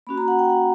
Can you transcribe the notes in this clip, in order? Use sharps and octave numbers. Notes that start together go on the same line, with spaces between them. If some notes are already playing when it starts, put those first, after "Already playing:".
A#3 C#4 F#4 B5
A#5
F#5
G5
F#5